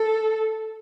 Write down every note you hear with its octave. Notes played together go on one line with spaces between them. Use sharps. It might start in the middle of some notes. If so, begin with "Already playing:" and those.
Already playing: A4